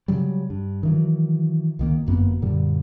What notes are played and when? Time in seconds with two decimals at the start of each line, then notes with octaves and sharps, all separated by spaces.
0.08 C#3 F#3 G3
0.50 G2
0.83 D#3 E3 F#3
1.79 C#2 D#3 A#3
2.06 G1 F#2 A#3 B3
2.42 F#2 A#2 D3 G3